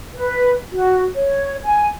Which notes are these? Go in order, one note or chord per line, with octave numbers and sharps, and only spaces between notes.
B4
F#4
C#5
G#5